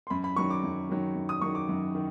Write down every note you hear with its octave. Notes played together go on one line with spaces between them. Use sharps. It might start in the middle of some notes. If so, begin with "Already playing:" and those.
C6
F#2 B5
B5
D#3 F#3 C#6
D6
F#2
D#3 F#3
F#2
D#6
D#3 F#3 C#6
D6
F#2
D#3